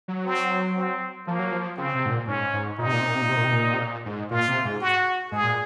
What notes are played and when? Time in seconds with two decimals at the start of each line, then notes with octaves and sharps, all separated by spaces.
0.08 F#3
0.25 C4
0.76 C4
1.27 F3 A#3
1.39 F#3
1.52 F3
1.77 C#3 C4
1.95 C3
2.06 G#2
2.11 A#2
2.27 G#2 C#4
2.53 G#2
2.78 A#2 D#4
2.86 C3
2.93 A#2
3.01 C3
3.07 A#2
3.15 C3
3.22 A#2
3.29 C3
3.37 A#2
3.45 C3
3.52 A#2
3.74 C3
3.80 A#2
4.06 G#2
4.30 A#2 F4
4.48 C3
4.65 G#2
4.81 F#4
5.32 G#2 G#4
5.43 A#2